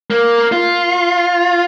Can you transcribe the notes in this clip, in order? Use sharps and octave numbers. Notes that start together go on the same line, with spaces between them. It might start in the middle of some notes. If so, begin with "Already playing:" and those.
A#3
F4